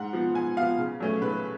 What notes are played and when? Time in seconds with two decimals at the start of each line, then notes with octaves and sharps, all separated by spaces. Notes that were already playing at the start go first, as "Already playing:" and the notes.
Already playing: G#2 F#5
0.13 F3 B3
0.34 G#2 G#5
0.57 B3 F5
0.61 F3
0.78 C#3
1.00 F#3 A3 C#4
1.22 C#3 B4